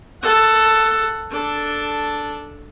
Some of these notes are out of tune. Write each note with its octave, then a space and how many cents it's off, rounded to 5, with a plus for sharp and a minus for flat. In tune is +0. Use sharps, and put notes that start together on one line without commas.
A4 +5 F#5 +0
D4 +0 A4 +0